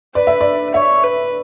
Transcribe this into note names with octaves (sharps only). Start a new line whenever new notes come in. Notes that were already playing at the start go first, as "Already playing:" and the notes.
B4 D5
E5
D5
C#5 E5
B4